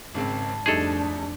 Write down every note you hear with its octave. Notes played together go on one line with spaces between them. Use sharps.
G#1 G#2 C#3 C4 A5
F2 G3 A3 D4 D#4 G#4 A4